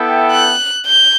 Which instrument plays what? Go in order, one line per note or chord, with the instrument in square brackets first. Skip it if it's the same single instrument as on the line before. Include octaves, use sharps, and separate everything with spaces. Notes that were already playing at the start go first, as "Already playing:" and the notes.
Already playing: [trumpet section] B3 E4 A4 E5 G5
[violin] F#6
G6